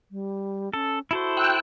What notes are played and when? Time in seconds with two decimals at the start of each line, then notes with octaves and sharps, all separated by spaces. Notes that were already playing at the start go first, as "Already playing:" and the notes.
0.11 G3
0.74 C#4 A4
1.11 E4 F#4 A4 C5
1.37 G5 E6 F#6